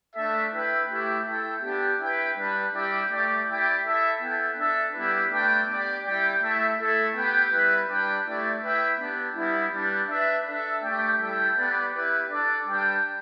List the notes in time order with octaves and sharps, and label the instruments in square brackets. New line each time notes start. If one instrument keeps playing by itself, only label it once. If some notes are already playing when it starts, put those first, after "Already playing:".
[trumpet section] A3 D4 A4 E5
E4 B4 E5 G5
A3 E4 G4
E4 A4 G5
B3 D4 G4
E4 B4 G5
G3 D4 B4
G3 E4 G4 D5 G5
A3 G4 D5
E4 G4 D5 G5
E4 A4 E5
B3 E4 A4 G5
D4 A4 E5
G3 B3 E4 G4 B4
A3 D4 B4 D5 G5
B3 G4 D5
G3 E4 G4 D5 G5
A3 E4 A4 E5
A3 E4 A4
B3 G4 B4 G5
G3 E4 B4
G3 D4 B4 D5 G5
A3 E4 G4 D5
E4 B4 E5 G5
B3 D4 G4
G3 B3 E4
G3 D4 B4
D4 B4 E5
D4 A4 E5
A3 G4 D5 G5
G3 E4 A4 G5
B3 G4 B4 D5
E4 G4 B4
D4 A4 D5
G3 D4 B4 G5